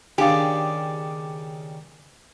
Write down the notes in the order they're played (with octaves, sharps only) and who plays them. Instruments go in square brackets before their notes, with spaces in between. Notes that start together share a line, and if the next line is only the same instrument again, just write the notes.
[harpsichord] D#2 C#3 [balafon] D4 F5 [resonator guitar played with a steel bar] G4 [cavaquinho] G#4 D5